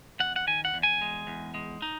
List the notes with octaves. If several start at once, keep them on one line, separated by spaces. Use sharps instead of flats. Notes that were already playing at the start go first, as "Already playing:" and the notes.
E2 F#5
F#5
D#3 G#5
F#5
E2
G#5
G#3
E2
G#3
D#4